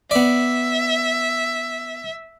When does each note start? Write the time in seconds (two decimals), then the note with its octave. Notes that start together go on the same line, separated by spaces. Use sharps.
0.11 B3 D5 E5